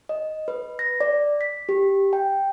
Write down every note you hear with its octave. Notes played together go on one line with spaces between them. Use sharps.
D#5
B4
A#6
D5
B6
G4
G5